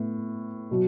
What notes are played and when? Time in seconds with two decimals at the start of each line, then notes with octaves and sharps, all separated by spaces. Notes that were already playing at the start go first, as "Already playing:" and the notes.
Already playing: A2 B3
0.71 B2 F#3